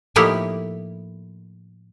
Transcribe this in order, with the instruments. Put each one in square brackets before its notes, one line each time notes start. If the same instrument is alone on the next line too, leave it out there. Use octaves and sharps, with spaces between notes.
[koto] A2 F3 A#3 D#4 E4 G4